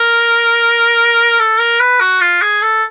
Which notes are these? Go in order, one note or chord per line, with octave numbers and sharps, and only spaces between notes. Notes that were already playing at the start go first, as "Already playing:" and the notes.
Already playing: A#4
A4
A#4
B4
F#4
F4
G#4
A4